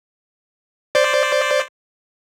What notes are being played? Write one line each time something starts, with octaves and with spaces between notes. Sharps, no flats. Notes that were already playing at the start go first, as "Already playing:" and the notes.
C5 D5